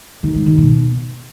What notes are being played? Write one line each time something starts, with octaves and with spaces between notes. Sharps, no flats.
D#3
G#2
D#3
B2